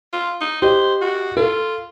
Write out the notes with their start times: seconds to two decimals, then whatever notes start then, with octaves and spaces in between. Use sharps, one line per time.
0.13 F4
0.41 D#4
0.62 G4 C5 D#5
1.02 F#4
1.37 F4 A4